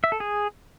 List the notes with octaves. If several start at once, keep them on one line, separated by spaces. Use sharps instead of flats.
E5
A4
G#4